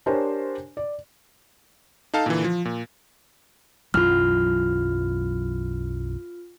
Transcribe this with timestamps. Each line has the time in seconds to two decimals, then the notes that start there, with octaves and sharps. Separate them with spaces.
0.06 D4 G4 A#4 C5 C#5 G#5
0.77 D5
2.14 D#4 A4 F5 A5
2.26 A#2 D3 E3
2.44 F3
2.65 A#2
3.94 B1 F#2 E3 F4 F6